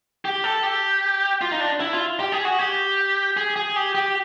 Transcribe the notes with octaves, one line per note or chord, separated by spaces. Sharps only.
G4
A4
G4
F4
D#4
D4
E4
F4
G4
G#4
F#4
G4
G#4
G#4
G4
G4